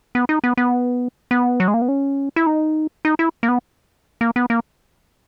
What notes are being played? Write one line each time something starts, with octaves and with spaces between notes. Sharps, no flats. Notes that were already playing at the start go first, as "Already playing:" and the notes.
B3
D#4
B3
B3
B3
F#3
G#3
A#3
B3
C#4
E4
D#4
D#4
E4
A#3
B3
A#3
B3
A#3